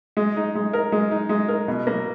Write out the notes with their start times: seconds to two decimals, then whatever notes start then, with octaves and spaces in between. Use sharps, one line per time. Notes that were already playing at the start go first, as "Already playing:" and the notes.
0.17 G#3
0.37 D#4
0.55 G#3
0.73 A#4
0.92 G#3
1.11 D#4
1.29 G#3
1.48 A#4
1.68 B2
1.87 A#3